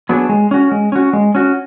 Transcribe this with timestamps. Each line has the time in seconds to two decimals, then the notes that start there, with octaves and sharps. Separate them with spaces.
0.09 F#3 B3 D4 G#4
0.29 G#3
0.51 C#4 F#4
0.71 G#3
0.92 C#4 F#4
1.13 G#3
1.35 C#4 F#4